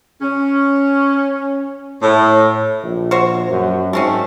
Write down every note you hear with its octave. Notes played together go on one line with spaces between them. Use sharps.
C#4
A2
A#1
F#4 C5 C#5
F#2
G#2 A3 C4 C#4